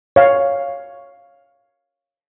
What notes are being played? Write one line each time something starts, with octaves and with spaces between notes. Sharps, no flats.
C#5 F5